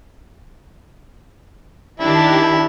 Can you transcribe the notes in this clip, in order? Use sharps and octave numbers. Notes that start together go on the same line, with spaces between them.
D#3 D4 E4 G4